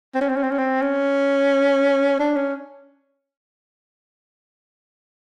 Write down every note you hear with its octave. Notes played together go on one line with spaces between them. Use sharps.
C4
C#4
C4
C#4
C4
C#4
C4
C#4
D4
C#4